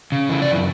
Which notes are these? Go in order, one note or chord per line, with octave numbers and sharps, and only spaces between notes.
C#3
E3
D5
F#2